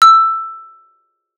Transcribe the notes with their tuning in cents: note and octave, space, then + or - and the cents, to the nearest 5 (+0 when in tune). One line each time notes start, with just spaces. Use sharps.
E6 +10